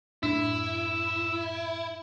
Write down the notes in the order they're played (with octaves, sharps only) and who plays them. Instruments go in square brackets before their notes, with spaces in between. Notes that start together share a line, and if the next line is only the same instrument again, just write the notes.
[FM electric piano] F#2 A2 [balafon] D4 [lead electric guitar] E4 [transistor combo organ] E6